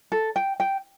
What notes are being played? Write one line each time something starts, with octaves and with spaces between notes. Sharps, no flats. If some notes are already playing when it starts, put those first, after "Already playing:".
A4
G5
G5